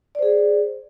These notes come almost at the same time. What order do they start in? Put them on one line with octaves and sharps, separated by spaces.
D5 C5 G#4